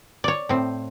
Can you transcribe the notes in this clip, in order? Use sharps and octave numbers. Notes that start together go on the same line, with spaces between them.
C#5 D5
A2 C4